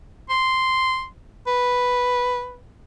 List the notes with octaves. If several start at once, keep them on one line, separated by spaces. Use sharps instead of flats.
C6
B4